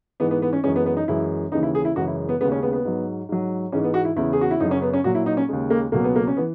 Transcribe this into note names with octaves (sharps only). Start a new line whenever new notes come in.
G#2 E3 G#3 B3
B3
B3
C#4
F#2 E3 G#3 C#4
B3
B3
D#4
F#2 E3 G#3 E4
D#2 C#3 E3 D#4
E4
G#4
E4
F#2 C#3 E3 G#3 F#4
E4
B3
D#2 C#3 G#3 B3
C#4
B3
B3
G#2 F#3
G#2 F#3
G#2 E3 G#3 C#4
B3
F#4
E4
E2 C#3 E3 E4
G#4
F#4
E4
F#2 C#3 F#3 D#4
C#4
B3
C#4
A#2 F#3 F#4
E4
D#4
C#4
D#2 C#3 G#3
A#3
C#2 B2 F#3 A#3
B3
A#3
C#4
E3 B3